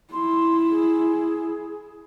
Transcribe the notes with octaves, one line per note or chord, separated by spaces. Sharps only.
E4 C6
G#4